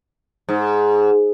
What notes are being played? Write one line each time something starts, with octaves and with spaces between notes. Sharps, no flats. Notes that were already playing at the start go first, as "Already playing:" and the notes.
G#2